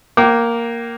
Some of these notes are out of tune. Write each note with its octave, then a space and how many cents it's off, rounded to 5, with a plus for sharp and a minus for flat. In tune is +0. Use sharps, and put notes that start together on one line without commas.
A#3 +0 G5 -30 D6 +0